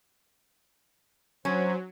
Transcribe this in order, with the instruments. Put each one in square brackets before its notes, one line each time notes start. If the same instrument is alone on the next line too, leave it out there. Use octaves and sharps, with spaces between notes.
[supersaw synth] F#3 [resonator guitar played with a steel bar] C#4 [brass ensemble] C5